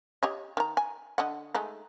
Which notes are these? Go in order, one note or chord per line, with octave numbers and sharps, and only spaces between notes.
G4 C#5 D#5
D#3 A#5
G#5
D3 D#5 F#5
G#3 A3 D#4